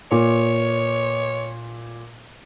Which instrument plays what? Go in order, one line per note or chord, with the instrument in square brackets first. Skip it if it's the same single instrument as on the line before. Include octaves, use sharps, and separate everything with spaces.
[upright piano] A#2 [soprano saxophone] C#5